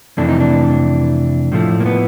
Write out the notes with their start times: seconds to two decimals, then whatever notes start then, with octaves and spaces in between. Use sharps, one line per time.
0.17 F2 C3 E3 A3 D4
0.29 D#4
0.40 D4
1.52 A2 F3 A3
1.80 A#3
1.86 B3